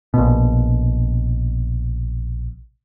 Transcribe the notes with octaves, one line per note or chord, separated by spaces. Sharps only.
A#1 B2